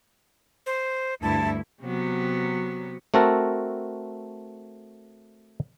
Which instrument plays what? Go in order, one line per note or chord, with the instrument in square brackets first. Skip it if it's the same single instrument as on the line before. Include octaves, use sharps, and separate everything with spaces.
[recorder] C5
[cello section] D2 G2 E4 [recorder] A5
[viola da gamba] C3 F#3 B3
[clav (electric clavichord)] A3 C4 F#4 A4 A#4